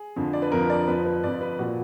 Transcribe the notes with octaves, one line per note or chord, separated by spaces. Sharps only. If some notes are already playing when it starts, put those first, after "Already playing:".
Already playing: G#4
F2 D3 F3
D5
B4
F2 D3 F3 A#4
D5
F2 F3 B4
B4
F2 F3 D5
B4
A#2 F3 F#4